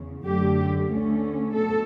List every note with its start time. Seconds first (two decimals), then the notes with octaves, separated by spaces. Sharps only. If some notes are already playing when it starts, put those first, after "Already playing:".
Already playing: E2 C#3
0.27 F#2 D3 F#3 A3 G4
0.91 D2 D3 A3 C#4
1.54 B2 A4